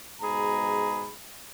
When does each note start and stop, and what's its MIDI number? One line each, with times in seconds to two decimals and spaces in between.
0.21 1.09 44
0.21 1.09 47
0.21 1.09 68
0.21 1.09 82
0.21 1.09 83